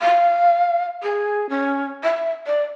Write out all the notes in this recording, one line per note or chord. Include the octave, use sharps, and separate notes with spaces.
F5
G#4
C#4
E5
D5